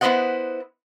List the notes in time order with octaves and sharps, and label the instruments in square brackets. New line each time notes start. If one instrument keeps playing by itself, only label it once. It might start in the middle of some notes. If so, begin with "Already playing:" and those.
[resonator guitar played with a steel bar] B3 E4 B4 C5 D#5 F#5